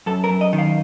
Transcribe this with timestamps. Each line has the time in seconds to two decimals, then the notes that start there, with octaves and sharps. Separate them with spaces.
0.06 F#2 A4
0.24 A#4
0.30 F#2
0.41 D#5
0.53 D#3
0.59 F5